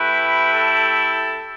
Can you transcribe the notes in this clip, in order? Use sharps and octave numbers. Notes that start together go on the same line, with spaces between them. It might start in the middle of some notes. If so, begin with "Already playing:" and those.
Already playing: A3 E4 G4 B4
A4